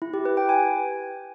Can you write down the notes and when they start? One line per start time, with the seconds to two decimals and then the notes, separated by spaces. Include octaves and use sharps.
0.02 E4
0.14 G4
0.25 B4
0.37 G5
0.49 G#5